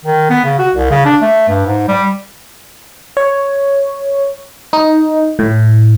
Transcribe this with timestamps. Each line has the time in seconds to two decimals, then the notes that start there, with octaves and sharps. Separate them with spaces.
0.05 D#3
0.30 B3
0.44 C#3
0.59 F#4
0.75 C2
0.90 C#3
1.05 D4
1.22 A3
1.48 G2
1.66 G#2
1.88 G3
3.17 C#5
4.73 D#4
5.39 A2